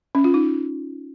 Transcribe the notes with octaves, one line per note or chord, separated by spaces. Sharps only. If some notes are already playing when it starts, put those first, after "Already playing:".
C#4
F4
D#4